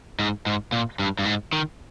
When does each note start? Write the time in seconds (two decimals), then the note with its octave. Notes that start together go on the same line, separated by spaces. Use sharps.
0.19 G#2
0.46 G#2
0.72 A#2
0.99 G2
1.19 G2
1.25 G#2
1.53 D#3